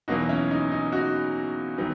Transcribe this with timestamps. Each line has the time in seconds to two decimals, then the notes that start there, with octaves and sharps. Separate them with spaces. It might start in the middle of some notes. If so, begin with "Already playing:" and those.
0.08 E2 B2 F#3 A#3 D#4 F#4
0.29 C#4 E4
0.51 D#4
0.72 D#4
0.92 D#4 F#4
1.78 D#3 F#3 B3